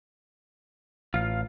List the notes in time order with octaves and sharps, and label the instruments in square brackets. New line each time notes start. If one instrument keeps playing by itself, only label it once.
[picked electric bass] A1 [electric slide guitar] F4 F5